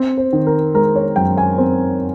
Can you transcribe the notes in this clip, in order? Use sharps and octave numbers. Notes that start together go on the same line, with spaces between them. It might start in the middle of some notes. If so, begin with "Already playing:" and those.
Already playing: C4
C5
D#3
A#4
G#3 A#4
C#5
F#2 G5
G#5
C4